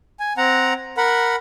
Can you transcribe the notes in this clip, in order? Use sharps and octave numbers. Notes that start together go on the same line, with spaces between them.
G#5
C4 F#5 A#5
A#4 F#5 B5